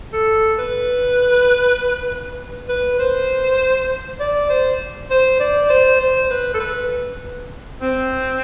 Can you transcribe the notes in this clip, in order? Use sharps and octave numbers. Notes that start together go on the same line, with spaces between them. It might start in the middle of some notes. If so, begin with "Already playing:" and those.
A4
B4
B4
C5
D5
C5
C5
D5
C5
C5
B4
A4
B4
C4